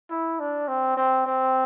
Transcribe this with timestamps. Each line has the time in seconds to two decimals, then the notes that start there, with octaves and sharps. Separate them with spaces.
0.10 E4
0.40 D4
0.68 C4
0.97 C4
1.27 C4